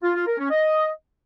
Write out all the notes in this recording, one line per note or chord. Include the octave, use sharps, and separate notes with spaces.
F4
F4
A#4
C#4
D#5